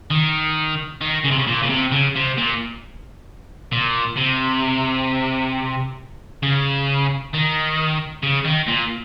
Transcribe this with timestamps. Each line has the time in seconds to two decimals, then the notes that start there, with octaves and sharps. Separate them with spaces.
0.11 D#3
1.02 D#3
1.25 C#3
1.31 C3
1.39 C#3
1.47 A#2
1.63 C#3
1.70 C3
1.92 C#3
2.15 C3
2.37 A#2
3.73 A#2
4.17 C3
6.43 C#3
7.33 D#3
8.23 C#3
8.45 D#3
8.68 A#2